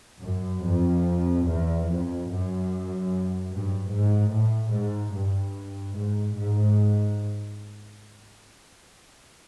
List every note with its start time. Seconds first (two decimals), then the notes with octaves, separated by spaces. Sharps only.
0.23 F#2
0.64 F2
1.46 E2
1.87 F2
2.28 F#2
3.51 G2
3.91 G#2
4.33 A2
4.73 G#2
5.14 G2
5.96 G#2
6.37 G#2